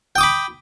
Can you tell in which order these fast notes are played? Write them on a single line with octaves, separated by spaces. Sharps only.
G5 D#6 D6 B5